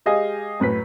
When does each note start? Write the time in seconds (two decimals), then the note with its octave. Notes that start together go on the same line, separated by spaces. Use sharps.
0.06 G#3 G4 G#4 D#5 F5 G#5
0.60 F#2 A2 B4 B6